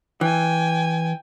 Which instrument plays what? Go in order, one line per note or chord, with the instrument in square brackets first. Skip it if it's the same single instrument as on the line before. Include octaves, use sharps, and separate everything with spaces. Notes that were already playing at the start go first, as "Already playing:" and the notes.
[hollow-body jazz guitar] E3 [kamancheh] G5 G#5